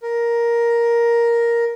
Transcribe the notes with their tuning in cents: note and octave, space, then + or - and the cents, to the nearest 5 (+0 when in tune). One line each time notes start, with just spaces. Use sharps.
A#4 +5